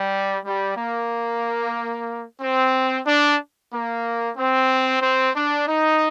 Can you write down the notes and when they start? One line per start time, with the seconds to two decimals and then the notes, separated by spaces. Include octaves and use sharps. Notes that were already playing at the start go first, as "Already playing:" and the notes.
Already playing: G3
0.45 G3
0.77 A#3
2.41 C4
3.06 D4
3.72 A#3
4.37 C4
5.02 C4
5.35 D4
5.67 D#4